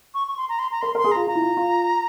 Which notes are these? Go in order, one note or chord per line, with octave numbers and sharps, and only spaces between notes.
C#6
C#6
C6
A#5
C6
A#5
A#4 C6
A#4 C6
G#4
F4 A#5
F4 A#5
E4
F4
F4